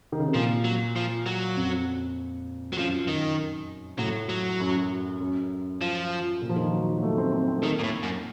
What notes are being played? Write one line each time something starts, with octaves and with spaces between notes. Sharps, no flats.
D#3
C#3
C3
A#2 F3
F#3
F3
F#3
F2
F#3
F#2 F3
D#3
A2 F#3
F#3
F#2
F#2
F3
A#2
F3
D#3
F#3
F#3
F#3
A3
C4
C4
C4
A3
D#3 A#3
A#2
A2
F#2